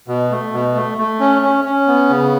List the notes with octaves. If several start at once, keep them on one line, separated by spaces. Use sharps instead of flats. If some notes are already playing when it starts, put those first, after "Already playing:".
B2
A3
B2
A3
A3
C#4
C#4
C#4
B3
C#3